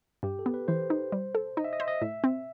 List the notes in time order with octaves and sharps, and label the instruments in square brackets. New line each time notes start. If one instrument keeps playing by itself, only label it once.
[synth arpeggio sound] G2 [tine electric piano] G4
[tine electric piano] A4
[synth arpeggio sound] B3
[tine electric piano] B4
[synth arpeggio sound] E3 [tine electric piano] C5
[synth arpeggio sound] D#4
G3
A4
[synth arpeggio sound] D#4 [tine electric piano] D#5
[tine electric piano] E5
D#5
[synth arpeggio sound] C5 [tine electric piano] E5
[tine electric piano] D#5
[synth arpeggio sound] A2 [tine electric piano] E5
[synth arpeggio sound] C4